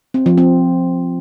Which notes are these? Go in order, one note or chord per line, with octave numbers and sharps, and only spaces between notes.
C4
F3
C4